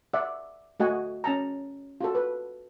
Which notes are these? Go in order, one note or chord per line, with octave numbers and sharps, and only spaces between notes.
D5 E5 F#5
A3 F#4 D#5 F#5 G#5
C#4 A5 A#5
F4 F#4 A4
B4